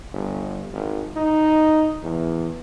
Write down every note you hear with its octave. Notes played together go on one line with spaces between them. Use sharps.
G1
G#1
D#4
E2